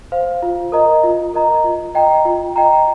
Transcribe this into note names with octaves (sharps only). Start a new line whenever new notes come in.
C5 F5
F4
A#4 D#5 A#5
F4
A#4 D#5 A#5
F4
D#5 G5 A#5
F4
D#5 G5 A#5